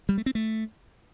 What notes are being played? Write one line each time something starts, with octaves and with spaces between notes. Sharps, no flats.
G3
A3
C4
A3